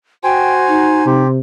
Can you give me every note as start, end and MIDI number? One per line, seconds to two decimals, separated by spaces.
0.24 1.05 66
0.24 1.06 72
0.24 0.54 79
0.24 1.06 80
0.68 1.21 63
1.06 1.39 48
1.06 1.27 67
1.06 1.30 84